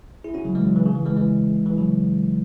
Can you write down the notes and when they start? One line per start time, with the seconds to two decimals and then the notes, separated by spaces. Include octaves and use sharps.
0.24 E4 G#4
0.34 C#4 F#4
0.45 C#3 F#3
0.55 E3 G#3
0.65 C#3 F#3
0.76 E3
0.85 C#3
0.95 E3
1.06 E3 G#3
1.17 E3 G#3
1.66 E3
1.77 C#3 F#3